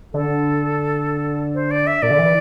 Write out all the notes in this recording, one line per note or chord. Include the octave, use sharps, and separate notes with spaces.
D3 A4
C5
D5
E5
A#2 D5
D3
E3